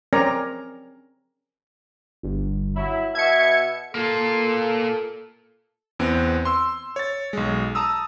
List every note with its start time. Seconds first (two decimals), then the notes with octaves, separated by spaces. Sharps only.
0.13 C4 C#4 A#4 D5 G#5 A#5
2.23 G1
2.76 F#3 E4
3.15 B2 E5 G#6 C#7
3.95 A#3 F4 A4
5.99 E2 B3 C4
6.45 C6 E6
6.96 C#5 A6
7.33 B1 G#3
7.75 A5 A#5 D#6 E6